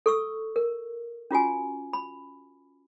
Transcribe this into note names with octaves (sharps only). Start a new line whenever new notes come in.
A4 C#6 E6
A#4
C#4 F4 F#4 G#5
B5